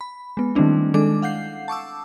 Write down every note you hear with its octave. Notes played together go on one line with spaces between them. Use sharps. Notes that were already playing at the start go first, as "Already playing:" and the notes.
B5
G#3 B3
D#3 G3 A3 C4 D4 E4
D#3 G#3 D4 A4 D6
F5 F#5 G6 C7
A5 C#6 D6 E6